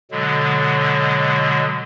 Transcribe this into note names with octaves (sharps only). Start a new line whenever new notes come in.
B2 D3 F#3 G#3